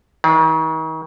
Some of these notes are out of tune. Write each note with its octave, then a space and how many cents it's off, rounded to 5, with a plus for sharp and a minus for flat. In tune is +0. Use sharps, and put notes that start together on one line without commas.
D#3 +40